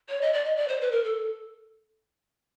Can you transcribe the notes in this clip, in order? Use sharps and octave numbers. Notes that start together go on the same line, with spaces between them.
C#5
D#5
D5
D#5
D5
C5
B4
A#4
A4